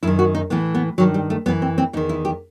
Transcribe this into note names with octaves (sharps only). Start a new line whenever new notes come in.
F#2 D#3 E4
F#4
D#4
A2 E3 B3
B3
G2 D#3 F#3
G3
A3
F#2 E3 B3
C4
C4
E2 D#3 D#4
E4
G4